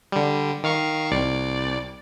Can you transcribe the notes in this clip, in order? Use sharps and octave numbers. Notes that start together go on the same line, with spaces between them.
D3 G3
D#3 F5 C#6
C2 D5